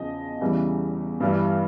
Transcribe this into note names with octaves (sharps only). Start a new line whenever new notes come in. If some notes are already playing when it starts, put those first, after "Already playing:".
Already playing: E2 C#3 F3 D#5
E2 C#3 E3 G3
G2 E3 G3